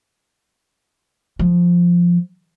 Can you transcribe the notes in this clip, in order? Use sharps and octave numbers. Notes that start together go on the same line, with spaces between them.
F3